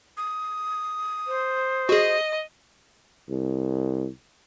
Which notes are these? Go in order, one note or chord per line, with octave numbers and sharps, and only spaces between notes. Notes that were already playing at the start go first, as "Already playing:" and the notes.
D#6
C5
F#4 G#4 D#5
C2